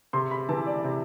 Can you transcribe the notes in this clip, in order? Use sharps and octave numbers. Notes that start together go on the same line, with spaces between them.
C3 C6
B5
E3 A5
D5
C3